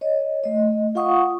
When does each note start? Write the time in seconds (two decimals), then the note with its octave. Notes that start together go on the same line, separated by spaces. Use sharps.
0.01 C#5 D#5
0.44 A3 D#5
0.95 F4 F5 F#5 C#6 D#6